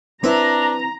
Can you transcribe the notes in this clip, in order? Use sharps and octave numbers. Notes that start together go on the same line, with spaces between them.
C4 D4 E4 B4 E5 A#5